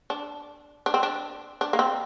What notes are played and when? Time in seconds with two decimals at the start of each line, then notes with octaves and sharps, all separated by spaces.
0.10 D4
0.86 D4
0.94 C4
1.03 D4
1.61 D4
1.73 A#3
1.79 C4